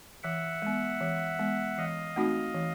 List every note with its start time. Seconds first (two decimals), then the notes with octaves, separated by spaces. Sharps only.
0.23 E3 E5 F#5
0.62 G#3 B3
1.01 E3
1.39 G#3 B3
1.78 E3 D#5 F5
2.16 A3 C4 D#4 F#4
2.54 E3